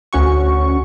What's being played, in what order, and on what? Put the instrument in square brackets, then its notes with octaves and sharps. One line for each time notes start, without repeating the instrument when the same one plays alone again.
[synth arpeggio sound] D2 C#4 F#4 C#6